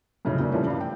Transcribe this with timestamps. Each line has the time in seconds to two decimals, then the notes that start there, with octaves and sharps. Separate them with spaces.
0.25 F2 A2 C#3 F#3 D#4
0.39 D#2 C3 F#3 C#4 D5
0.52 A#2 C#3 E3 F3 G3 A3
0.66 G2 F5
0.81 G5